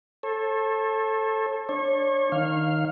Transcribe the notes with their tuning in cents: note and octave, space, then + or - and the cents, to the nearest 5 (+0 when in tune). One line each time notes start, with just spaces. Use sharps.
A4 +0 C#5 -40
D4 +0 C#5 -30
D#3 +0 F5 +0